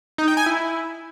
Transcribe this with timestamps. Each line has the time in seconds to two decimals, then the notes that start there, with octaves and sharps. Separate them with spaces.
0.18 D#4
0.28 G5
0.37 G#5
0.46 E4